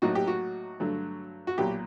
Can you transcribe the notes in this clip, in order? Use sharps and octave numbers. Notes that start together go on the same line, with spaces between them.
A2 F#3 A#3 D#4 F#4
G4
F#4
G2 D3 F#3 A3
F#4
B1 A#2 F#3 G4